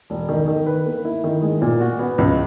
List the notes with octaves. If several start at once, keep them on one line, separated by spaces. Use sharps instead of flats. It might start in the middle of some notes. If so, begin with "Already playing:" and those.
E1
D#3
D#3
B4
A#3
E4
D#3
G#3
A#2
F#4
B3
C#2